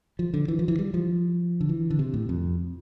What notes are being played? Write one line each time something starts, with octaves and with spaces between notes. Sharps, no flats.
F3
D3
E3
F3
E3
G3
F3
D3
E3
D3
C3
A2
F2